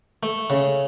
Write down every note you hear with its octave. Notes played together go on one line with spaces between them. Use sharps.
A3
C#3